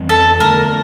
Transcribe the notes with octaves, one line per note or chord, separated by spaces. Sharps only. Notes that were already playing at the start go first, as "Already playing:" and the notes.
Already playing: F2 E3 G3 C4
A4
E2 D3 A3 A#4